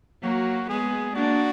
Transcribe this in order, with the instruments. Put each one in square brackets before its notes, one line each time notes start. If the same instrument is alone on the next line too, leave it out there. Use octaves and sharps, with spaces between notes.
[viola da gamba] F#3 A#3 [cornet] F#4
[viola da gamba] G#3 B3 [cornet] G#4
[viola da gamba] A#3 D4 [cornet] F#4